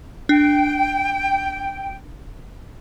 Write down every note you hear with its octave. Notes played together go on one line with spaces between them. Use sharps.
D4 G5